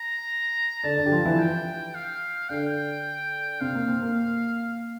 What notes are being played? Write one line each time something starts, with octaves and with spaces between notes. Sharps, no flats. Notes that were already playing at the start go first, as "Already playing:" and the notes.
Already playing: A#5
D3 D4 A5
D3 D4
G4
F3 F4
E3 E4
G5
F5
D3 D4 G5
C3 C4 F5
A#3
C3 C4
A#3